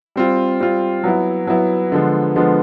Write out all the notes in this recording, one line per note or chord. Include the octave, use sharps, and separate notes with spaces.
G3 C4 F4
G3 C4 F4
F#3 B3 E4
F#3 B3 E4
D3 F3 G#3 B3
D3 F3 G#3 B3